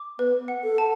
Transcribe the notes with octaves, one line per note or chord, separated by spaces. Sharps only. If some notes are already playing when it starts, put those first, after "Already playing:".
Already playing: D6
B3 B4
F#5
A4
A5